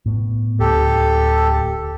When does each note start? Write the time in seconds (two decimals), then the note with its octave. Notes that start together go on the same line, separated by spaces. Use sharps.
0.06 A2 B3
0.60 D1 D2 G4 A4